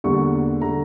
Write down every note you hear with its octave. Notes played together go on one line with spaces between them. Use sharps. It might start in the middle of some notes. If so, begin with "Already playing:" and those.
E2 D3 G3 A#3 C#6
D3 A3 A#5